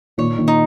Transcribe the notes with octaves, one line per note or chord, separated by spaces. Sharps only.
A#2 D#3 C#5
A#2 D#3
D#4